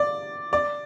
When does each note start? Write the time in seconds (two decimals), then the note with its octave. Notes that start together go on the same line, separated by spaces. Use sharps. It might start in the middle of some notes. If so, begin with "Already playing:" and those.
Already playing: D5
0.53 D5